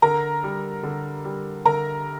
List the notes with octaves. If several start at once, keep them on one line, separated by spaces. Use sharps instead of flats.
D3 A#4 A#5
G3
D3
G3
D3 A#4 A#5